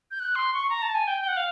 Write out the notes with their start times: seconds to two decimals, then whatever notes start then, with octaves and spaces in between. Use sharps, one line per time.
0.11 G6
0.20 F#6
0.35 C6
0.53 C#6
0.70 A#5
0.82 A5
0.95 G#5
1.07 G5
1.21 G5
1.28 F#5
1.37 F5